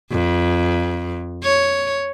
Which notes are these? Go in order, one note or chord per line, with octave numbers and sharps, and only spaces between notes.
F2
C#5